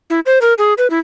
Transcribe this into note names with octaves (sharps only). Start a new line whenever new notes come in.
E4
C5
A#4
G#4
B4
E4